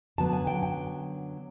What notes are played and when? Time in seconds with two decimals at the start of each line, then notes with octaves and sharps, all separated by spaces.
0.18 F#2 D3 F#3 B3 A5
0.33 G#5
0.47 G5
0.63 G5